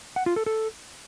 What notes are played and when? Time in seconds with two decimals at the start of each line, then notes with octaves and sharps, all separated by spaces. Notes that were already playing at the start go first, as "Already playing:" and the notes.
0.16 F#5
0.26 F4
0.36 A4
0.46 A4